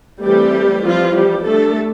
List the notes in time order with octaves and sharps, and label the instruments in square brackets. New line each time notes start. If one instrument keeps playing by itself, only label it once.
[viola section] E3 G3 A3 C4 G4
E3 F3 G3 C4 F4
G3 G4
G3 A3 D4 A4